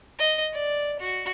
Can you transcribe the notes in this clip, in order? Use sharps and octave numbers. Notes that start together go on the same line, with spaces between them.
D#5
D5
F#4